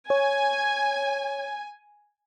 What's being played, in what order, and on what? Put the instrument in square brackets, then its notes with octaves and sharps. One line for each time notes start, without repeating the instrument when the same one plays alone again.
[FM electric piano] C#5 [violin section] G#5